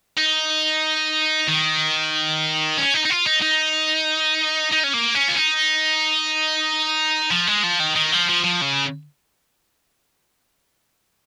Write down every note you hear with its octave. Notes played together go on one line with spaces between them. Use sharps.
D#4
D#3
C#4
D#4
D#4
F4
D#4
D#4
D#4
C#4
A#3
C#4
F4
D#4
F3
G#3
F3
D#3
D#3
F3
F3
F3
C#3